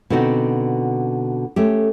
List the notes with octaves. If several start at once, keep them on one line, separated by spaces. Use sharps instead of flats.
B2 D3 C4 D#4 F#4
A3 C#4 G4